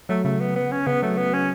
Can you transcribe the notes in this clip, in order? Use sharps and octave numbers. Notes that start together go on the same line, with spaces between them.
F#3 A3
C#3 A3
B3
B3
C#4
C#3 B3
F#3 A3
B3
C#4